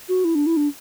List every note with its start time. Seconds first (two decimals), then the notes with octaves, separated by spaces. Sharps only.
0.09 F#4
0.25 E4
0.35 D4
0.46 E4
0.57 D4